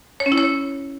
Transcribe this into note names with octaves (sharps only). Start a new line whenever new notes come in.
C#5
C#4
E4
C#5